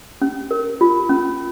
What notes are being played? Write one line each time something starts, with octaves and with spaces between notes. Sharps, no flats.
C#4
A#4
F4
C#4